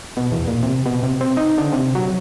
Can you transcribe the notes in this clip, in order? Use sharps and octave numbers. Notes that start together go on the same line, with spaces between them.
B2
E2
A#2
C3
B2
C3
C4
D#4
D3
C3
F#3